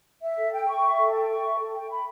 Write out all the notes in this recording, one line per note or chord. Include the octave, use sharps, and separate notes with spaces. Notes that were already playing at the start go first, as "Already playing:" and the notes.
E5
A4
G5
C#6
E5
A4
G5
C#6
E5
A4
G5
B5